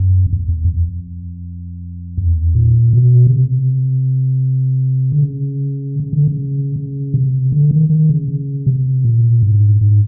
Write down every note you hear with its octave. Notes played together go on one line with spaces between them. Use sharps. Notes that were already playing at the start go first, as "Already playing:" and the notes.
Already playing: F#2
F2
E2
E2
F2
E2
A#2
B2
C#3
C3
D3
C#3
C#3
D3
C#3
C#3
C3
D3
D#3
D#3
C#3
C#3
C3
A#2
G#2
G#2